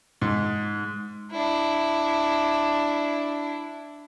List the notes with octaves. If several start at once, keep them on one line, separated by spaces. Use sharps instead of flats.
G#2
D4 E4